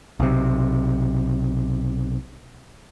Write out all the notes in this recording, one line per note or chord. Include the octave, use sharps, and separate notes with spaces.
B1 C3